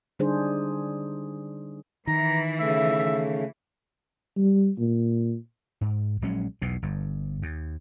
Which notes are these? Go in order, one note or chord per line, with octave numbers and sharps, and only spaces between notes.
D3 G3 D4 D#4 G#4 C5
D#3 E3 A#5
C#3 A3 E5
G3
A#2
G#2
A#1 F#3 G#3 C#4
B1 E2 B2
G1 G2
D#2